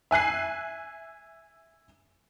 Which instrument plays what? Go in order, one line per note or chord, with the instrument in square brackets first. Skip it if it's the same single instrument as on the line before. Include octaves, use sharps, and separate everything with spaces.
[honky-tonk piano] E5 G#5 F#6 C7